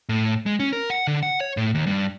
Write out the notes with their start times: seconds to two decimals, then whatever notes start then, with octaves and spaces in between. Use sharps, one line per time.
0.09 A2
0.46 G#3
0.60 C#4
0.73 A#4
0.90 F#5
1.07 D3
1.23 F#5
1.40 C#5
1.57 A2
1.75 D#2
1.87 G2